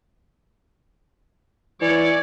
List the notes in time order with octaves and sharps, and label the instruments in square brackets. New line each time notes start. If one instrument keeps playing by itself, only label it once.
[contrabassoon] E3 [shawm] C#5 [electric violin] D5